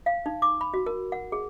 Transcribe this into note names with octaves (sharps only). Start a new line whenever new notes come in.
F5
D#4
D6
B5
F#4
A#4
F#5
G#4